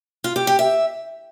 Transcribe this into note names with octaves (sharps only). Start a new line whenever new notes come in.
F4
G4
G4
E5